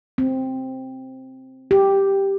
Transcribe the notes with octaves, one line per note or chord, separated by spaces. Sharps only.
C4
G4